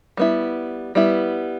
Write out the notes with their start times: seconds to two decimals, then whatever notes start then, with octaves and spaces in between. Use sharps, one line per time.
0.17 G3 B3 E4
0.95 G3 B3 E4